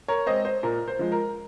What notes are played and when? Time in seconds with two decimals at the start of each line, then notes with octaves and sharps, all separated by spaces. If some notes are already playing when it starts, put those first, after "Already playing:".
0.08 A#4 C#5
0.26 G#3 C4 C5 D#5
0.45 C5
0.63 A#2 A#4
0.88 C5
0.99 F3 G#3
1.12 A#4